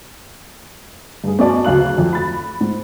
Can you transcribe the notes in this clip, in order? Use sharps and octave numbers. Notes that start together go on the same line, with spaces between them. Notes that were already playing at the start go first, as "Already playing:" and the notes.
G2 G#4
B3 C#4 F#4 D5 D#5 A5
D2 C#3 F#3 F5 F#6 F#7
F2 F#3
B5 A6
G#2